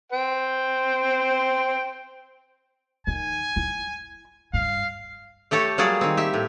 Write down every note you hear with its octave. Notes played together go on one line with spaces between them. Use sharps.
C5 G5
D#3 G#5
E4
G2 F5
A3 G4 A4 C#5
F#3 G3 A#3 G#4 D5
D#3 C4
G4 E5
A2